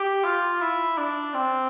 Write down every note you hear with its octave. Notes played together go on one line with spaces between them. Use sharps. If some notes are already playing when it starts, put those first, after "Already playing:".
Already playing: G4
F4
E4
D4
C4